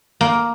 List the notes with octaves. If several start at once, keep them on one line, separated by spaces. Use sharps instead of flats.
A#3